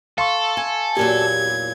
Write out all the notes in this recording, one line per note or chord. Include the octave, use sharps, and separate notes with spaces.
A4 F5 C6 C#6
G#5
E2 A#2 F#3 G4 G#6